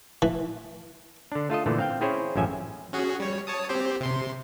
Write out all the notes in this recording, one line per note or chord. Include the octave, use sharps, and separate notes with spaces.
E3
D3 D4
A3 F4 A4 D#5
A#2 D3 E3 A3
C4 F5 G5
C4 C#4 E4 G#4 C5 C#5
A1 F#2 F3 C#4 E5 G#5
C#4 F#4 G#4
G3 C#5
C#5 A5 D#6
C4 G4 C5
C3 C6